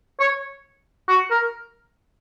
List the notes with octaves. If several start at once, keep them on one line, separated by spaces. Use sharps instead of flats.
C#5
F#4
A#4